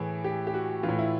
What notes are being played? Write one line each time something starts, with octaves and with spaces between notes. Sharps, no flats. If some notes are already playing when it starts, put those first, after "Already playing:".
Already playing: A2 E3 G#4
G4
G4
F#4
E3 F4
A2
E4